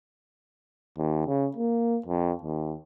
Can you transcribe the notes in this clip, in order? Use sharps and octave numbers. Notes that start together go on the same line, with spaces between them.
D#2
C#3
A#3
F2
D#2